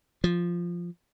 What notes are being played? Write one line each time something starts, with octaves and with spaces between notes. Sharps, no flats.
F3